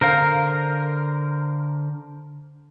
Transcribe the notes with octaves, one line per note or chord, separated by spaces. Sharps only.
D3 A#4 C5 F5